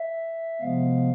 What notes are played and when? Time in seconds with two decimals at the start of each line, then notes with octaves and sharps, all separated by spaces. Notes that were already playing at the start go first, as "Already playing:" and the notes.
Already playing: E5
0.61 C3 F3 G#3 B3 F5